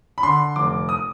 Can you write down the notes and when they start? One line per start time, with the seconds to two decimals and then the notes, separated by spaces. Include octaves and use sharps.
0.18 B5
0.23 D3 C6
0.56 F1 D6
0.89 D#6